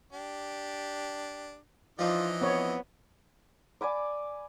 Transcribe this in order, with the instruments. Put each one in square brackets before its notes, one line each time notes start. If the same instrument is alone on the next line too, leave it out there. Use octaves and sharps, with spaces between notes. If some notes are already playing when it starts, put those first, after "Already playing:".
[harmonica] D4 G4
[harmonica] E3 D#5 [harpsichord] F3 D4 D#4 [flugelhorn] F4
[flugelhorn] B3 [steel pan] C4 C#5
[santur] D5 G#5 B5 D6